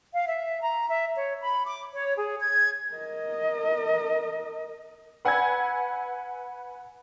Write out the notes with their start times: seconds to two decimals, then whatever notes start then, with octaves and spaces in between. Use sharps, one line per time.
0.13 F5
0.27 E5
0.62 A#5
0.89 E5
1.16 C#5
1.41 B5
1.65 D6
1.94 C#5
2.16 G#4
2.40 G#6
2.94 A#4 D#5
5.25 B4 F#5 G#5 B5 E6 G#6